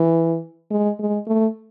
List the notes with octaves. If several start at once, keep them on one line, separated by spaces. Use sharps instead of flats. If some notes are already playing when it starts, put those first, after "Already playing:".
Already playing: E3
G#3
G#3
A3